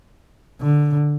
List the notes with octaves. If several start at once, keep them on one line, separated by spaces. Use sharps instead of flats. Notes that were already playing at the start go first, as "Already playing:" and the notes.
D3